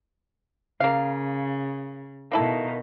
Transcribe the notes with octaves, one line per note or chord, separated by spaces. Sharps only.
C#3 A#3 F5
B2 D#3 A#3 E4 A4